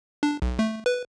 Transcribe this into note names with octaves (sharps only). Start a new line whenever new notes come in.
D4
B1
A3
B4